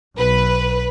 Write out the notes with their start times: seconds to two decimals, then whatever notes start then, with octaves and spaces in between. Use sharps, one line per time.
0.18 B1 B4